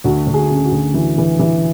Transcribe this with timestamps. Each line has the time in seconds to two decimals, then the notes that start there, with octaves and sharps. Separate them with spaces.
0.04 D2 F#4
0.27 D2
0.34 G#4
0.50 C#3
0.65 F#4
0.72 D2
0.94 E3
1.18 E3
1.39 E3